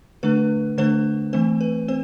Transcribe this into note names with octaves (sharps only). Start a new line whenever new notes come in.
D3 A3 D4 B4
D3 A3 D4 C5
E3 A3 C4 C5
B4
C4 C5